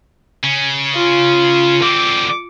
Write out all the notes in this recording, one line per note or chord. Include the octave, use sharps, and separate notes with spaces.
C#3 C#4
F4
D3 C4 D6